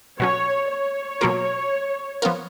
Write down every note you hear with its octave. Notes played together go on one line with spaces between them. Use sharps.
B2 F#3 C#4 C#5
C#5
B2 F#3 A#3 F4 A#4
F3 B3 F4 A#4